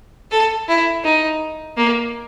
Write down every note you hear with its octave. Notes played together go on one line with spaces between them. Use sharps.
A4
E4
D#4
A#3